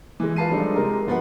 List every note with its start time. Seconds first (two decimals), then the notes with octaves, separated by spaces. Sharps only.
0.20 E3 G#3
0.36 F4 B4 A5 C7 D#7
0.50 F3 G3 G#3 D4 D#4 A4
0.76 C3 G#3 A#4
1.07 G1 F3 B4 F#5